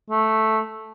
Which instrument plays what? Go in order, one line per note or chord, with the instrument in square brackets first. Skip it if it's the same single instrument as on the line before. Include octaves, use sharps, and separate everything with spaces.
[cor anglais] A3